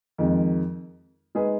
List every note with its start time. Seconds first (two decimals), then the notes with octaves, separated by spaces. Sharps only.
0.18 F2 D#3 G#3
1.35 G#3 D#4 G#4 B4